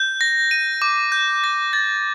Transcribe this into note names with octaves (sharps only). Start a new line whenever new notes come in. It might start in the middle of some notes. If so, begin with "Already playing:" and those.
Already playing: G6
A#6
D#7
D6
G6
A#6
A6